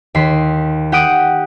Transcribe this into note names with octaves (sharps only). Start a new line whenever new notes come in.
D#2 C6 B6
G4 F#5 D#6 D7